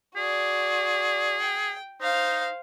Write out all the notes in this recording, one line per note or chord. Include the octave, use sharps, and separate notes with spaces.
F#4 G#4 D5
G5
D#4 C5 F5